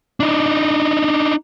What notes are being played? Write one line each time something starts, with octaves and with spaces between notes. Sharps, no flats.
D4 D#4